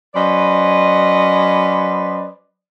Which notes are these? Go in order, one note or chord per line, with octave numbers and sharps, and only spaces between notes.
F#3 C#4 B4 C5 D5 D#5